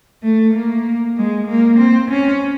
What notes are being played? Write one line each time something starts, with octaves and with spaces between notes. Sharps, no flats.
A3
A#3
G#3
A#3
C4
C#4